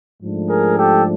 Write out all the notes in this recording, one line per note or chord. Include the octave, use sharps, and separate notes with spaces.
G#2 F3 A3 D4
G#4 A#4
G4 A4